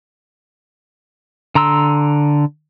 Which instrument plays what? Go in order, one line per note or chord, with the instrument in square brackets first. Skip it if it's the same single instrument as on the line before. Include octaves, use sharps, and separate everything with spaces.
[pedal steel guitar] D3 A#5 C6 E6